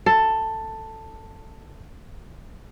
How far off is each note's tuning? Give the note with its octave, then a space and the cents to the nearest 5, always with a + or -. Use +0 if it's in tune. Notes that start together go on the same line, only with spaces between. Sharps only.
A4 +10